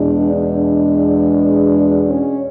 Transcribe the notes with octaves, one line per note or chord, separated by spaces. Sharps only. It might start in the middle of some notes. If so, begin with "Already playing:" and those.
Already playing: E2 B2 G#3 D4
D4
C#4